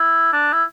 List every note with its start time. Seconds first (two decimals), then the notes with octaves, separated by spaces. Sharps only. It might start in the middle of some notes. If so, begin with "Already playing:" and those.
Already playing: E4
0.33 D4
0.53 E4